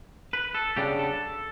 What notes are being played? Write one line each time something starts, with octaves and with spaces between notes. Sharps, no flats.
B4
A4
C#3 G3 B3 D4 G4
A4